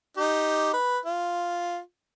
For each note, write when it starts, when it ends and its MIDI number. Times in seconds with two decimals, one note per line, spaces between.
0.17 0.73 63
0.17 0.73 67
0.73 0.99 71
1.05 1.79 65